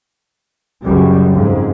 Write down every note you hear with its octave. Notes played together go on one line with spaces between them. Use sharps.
C#2 F#2 G3
F2 G#2